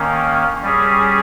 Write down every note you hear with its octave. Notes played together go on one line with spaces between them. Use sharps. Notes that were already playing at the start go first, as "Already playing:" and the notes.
Already playing: D#3 A#3 C#4
G3 C#4 G#4